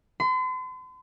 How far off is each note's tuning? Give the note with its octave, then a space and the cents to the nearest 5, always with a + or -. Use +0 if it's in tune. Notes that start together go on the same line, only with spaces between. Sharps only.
C6 -45